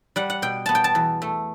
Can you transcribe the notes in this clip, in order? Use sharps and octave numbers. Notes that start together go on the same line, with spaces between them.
G3 F#5
F#5
B2 G5
B3 A5
G5
A5
E2
A3